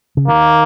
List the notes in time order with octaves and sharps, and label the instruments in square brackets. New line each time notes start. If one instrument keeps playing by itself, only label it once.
[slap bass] C#3
[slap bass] D#3 [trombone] A#3